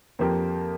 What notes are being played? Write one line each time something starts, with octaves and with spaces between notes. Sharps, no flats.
F2 F3 A#3 G4